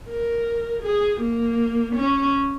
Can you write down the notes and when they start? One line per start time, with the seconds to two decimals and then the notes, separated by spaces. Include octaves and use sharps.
0.08 A#4
0.83 G#4
1.21 A#3
1.95 C#4